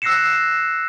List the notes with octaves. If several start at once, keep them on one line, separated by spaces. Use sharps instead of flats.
E6 F#6 A#6 C7 C#7 E7